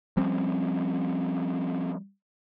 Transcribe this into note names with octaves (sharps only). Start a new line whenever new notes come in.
F3 G3 C4 C#4